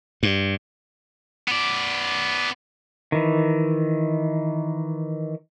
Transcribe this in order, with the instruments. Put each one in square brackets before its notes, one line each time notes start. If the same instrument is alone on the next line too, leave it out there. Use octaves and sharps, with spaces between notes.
[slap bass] G2
[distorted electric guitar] B3 D5
[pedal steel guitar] D#3 E3